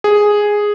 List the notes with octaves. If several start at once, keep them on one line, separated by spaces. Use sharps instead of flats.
G#4